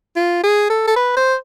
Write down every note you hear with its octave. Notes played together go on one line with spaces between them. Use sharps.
F4
G#4
A4
A4
B4
C5